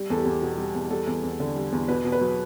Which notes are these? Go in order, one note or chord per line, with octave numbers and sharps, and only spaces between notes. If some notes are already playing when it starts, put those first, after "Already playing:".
Already playing: G3
E2 A4
G4
E2
B2
G3
E2
G3 A4
E2
E2
D3
G3
E2
B2 B4
B2
B4
F#3